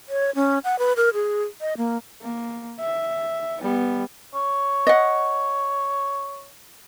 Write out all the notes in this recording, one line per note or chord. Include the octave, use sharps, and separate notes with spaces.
C#5
C#4
F#5
B4
A#4
G#4
D#5
A#3
A#3
E5
G3 B3
C#5
D#5 F#5